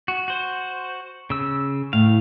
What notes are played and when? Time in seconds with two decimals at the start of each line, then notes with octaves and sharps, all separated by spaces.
0.08 F#4
0.28 F#4 C5
1.30 C#3 E6
1.93 A2 F5